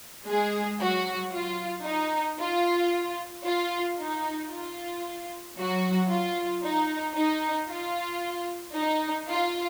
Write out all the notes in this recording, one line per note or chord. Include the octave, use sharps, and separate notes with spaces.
G#3 G#4
F#3 F#4
F4
D#4
F4
F4
D#4
F4
F#3 F#4
F4
D#4
D#4
F4
D#4
F4